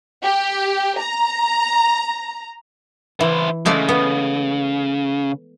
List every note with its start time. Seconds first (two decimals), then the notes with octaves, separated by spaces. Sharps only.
0.23 G4
0.99 A#5
3.21 E3 E4 C5
3.66 C#3 G#3 A3 D5
3.89 B3